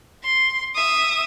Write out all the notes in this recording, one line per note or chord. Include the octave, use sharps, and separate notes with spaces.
C6
E5 D#6